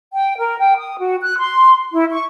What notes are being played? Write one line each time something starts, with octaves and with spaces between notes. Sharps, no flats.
G5
A#4
G5
D#6
F#4
F#6
C6
E4
C#6